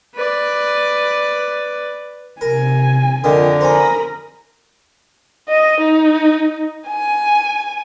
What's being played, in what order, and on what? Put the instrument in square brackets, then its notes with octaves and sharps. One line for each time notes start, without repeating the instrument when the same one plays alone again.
[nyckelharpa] B4 D5
[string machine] C3 [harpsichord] A#4 [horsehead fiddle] G#5
[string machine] F2 F4 A#5 [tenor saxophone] D3 [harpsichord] D#3
[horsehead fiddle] A#4 [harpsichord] C5 G#5 [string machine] B5 D#6 A#6
[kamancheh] D#5
D#4
G#5